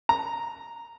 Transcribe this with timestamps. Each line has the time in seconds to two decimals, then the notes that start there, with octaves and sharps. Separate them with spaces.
0.09 A#5